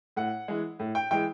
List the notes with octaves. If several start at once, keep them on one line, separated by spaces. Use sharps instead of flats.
A2 F#5
E3 G#3
A2
G5
E3 G#3 G5